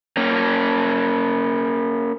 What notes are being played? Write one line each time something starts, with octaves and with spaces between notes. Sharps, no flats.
A#3 C#4